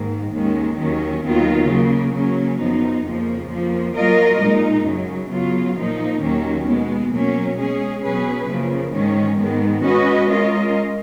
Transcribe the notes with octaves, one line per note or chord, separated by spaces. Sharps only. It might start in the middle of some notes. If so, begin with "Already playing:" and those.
Already playing: G#2 D#3 A#3
D#2 D#3 G#3 C#4
D#2 D#3 F#3 C#4
D#2 D#3 F#3 B3 F4
C#3 F#3 A#3
C#3 F#3 A#3 C#4
F#2 F3 B3 D#4
F2 C#3 F3 A#3
F2 F3 A#3
F#3 A#3 F4 A#4 D#5
A#2 G#3 D#4
F#2 C#3 F#3
C#3 F#3 B3 F4
A#2 F3 A#3 D#4
D#2 D#3 F#3 A#3 C#4
B2 G#3 B3
B2 F#3 A#3 C#4
G#3 C#4 G#4
B2 F#3 C#4 G#4 B4
F#2 C#3 F3 A#3
G#2 D#3 G#3 C#4
G#2 D#3 G#3 B3
G#3 C#4 F#4 B4 D#5
G#3 C#4 F4 A#4 D#5